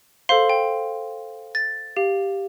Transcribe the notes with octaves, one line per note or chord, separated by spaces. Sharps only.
A4 C5 F5 C6
G5
A6
G4 F5